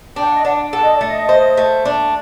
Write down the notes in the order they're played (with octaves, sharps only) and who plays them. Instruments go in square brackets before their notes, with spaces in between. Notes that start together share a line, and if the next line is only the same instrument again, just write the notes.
[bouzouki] D4 [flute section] G5
[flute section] F#5
D#5
[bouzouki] D4 [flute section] F#5
[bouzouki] A4 [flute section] F#5
[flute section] D#5
D5
[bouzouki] A3
[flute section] D#5
[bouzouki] C5
A3
D4